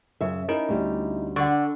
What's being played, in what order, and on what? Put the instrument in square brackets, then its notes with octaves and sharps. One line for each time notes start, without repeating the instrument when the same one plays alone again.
[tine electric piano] F#2 [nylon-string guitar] C#3 E5
[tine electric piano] C#4 D#4 E4 [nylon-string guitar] A#4
[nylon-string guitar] D2 G3
[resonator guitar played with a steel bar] D3 [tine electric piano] D5 [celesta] F#5 C#6